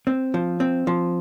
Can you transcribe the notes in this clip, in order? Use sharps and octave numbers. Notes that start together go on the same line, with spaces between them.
C4
F3
C4
F3